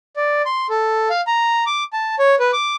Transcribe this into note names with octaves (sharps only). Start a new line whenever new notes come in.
D5
C6
A4
F5
A#5
D6
A5
C#5
B4
D6